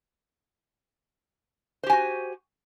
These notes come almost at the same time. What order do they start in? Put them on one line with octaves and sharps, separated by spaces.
C5 G4 G#5 F#4